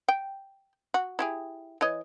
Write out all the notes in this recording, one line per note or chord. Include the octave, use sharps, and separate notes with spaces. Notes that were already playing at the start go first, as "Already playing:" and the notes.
G5
F#4
E4 G4 G#4
E3 C#5 D#5